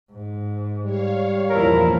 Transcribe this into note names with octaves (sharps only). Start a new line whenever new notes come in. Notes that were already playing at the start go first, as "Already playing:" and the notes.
G#2
G3 C#5 F5
E2 G2 A#2 F3 E4 A#4